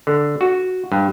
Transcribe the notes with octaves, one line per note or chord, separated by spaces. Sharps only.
D3
F#4
G2